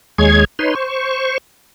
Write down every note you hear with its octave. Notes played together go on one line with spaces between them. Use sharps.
D#2 G#3 G#4 C#5 G#6
D#4 B4 C#5 C6
C5 C#6